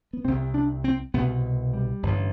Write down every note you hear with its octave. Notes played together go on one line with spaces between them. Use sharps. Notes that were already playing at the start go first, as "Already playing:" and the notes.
B3
C2 C3 C4
D4
C4
C2 B2 B3
G3
A1 G2 D3